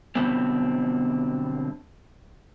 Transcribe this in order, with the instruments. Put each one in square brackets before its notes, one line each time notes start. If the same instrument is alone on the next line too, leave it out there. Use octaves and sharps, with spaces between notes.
[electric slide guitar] B2 D3 F#3 G3 B3 C4